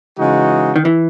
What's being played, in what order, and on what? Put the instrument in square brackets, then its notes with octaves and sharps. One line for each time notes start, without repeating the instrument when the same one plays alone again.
[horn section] C#3 E3 G#3 D#4 F#4
[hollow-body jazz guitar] D#3
E3